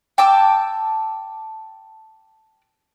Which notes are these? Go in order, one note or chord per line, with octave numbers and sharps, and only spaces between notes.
G5 A5 D6 E6